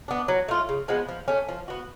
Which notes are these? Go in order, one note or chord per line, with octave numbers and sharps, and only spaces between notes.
B3 D4
F#3
A3 F4
C#3
F3 G#3 B3
F3
A3 C#4
F3
B3 F#4